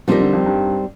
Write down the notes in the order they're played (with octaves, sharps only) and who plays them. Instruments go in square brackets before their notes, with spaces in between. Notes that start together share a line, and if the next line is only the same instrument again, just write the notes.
[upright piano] F3 [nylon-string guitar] G3 C4 D#4 G4 A#4
[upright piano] D3
F2
G2